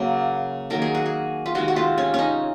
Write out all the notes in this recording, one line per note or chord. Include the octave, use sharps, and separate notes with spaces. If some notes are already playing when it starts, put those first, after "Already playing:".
Already playing: C#3 F#3 A#3
D#3 F#3 A#3 A#4
G#4
F#4
G#4
F4
C3 D#3 G#3 F#4
F#4
F4
C#4
C#4 D#4